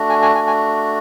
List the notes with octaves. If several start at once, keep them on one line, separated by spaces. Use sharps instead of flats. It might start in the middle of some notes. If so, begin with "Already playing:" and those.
Already playing: A3 D4 F#4
G#5
G#5
G#5
G#5